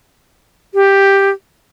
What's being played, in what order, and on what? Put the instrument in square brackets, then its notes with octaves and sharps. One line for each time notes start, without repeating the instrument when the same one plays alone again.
[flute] G4